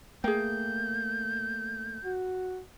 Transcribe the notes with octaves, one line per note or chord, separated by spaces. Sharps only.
A3 A#3 G#4 G5 G6
F#4